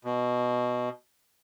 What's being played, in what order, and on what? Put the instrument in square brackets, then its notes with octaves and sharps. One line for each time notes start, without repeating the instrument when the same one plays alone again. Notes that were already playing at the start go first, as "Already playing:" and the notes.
[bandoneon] B2